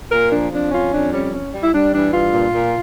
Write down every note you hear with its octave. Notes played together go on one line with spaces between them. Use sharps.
A#2 A#4
F3 D4
F2 D4
C#4 F4
F2 D4
G3 C#4
C#4
G3
E4
G3 D4
E3 D4
G2 F4
A#2
A#2